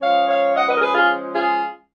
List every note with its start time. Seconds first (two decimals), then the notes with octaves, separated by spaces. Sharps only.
0.01 F3 G#3 C#4 C#5 F5
0.28 C#5 F5
0.55 D#5 F#5
0.68 B4 D#5
0.77 A#4
0.81 G#4 B4
0.94 F4 G#4
1.34 F4 G#4